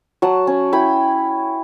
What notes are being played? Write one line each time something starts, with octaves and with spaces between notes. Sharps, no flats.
F#3 F#5 A5
C#4
E4 G5 B5